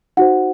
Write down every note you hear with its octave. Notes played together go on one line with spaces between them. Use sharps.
D#4 F#4 C5 F#5